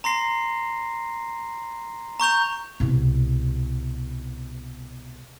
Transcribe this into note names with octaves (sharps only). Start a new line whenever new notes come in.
A#5 C6 A#6 C7
A#5 C#6 G6 F7
C2 B2